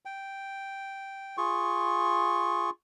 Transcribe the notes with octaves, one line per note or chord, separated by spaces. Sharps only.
G5
F4 G#4 C#6